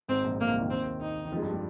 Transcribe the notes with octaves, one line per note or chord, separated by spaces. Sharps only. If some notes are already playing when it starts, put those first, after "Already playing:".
G#1 G#2 C4
A#1 A#2
A#1 A#2 A#3
C2 C3
D#2 D#3
C4
D#4
D#3
F2 F3
G#3
G2 G3
G#3